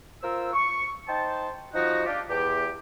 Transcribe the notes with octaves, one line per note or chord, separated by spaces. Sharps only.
F4 A#4 C5 E6
C#6
D#4 C5 G5 A5
F3 D#4 F#4
D4 F4 G4
E2 G4